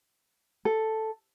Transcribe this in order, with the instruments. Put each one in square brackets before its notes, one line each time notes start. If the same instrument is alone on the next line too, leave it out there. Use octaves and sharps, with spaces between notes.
[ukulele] A4